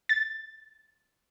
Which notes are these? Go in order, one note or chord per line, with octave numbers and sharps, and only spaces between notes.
A6